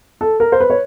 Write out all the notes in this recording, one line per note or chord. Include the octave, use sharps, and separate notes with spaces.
A4
A#4
C5
B4
C#5